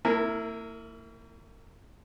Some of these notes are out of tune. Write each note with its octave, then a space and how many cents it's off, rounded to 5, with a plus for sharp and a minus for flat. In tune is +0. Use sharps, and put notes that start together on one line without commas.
A#3 -40 E4 +0 A#4 +0